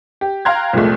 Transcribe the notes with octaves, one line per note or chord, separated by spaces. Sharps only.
G4
F5 G5 A#5 C6 F#6 G#6
C2 F2 A#2 G#3 A3